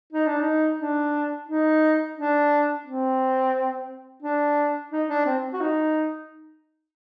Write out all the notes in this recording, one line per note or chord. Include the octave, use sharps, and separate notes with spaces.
D#4
D4
D#4
D4
D#4
D4
C4
D4
D#4
D4
C4
F#4
D#4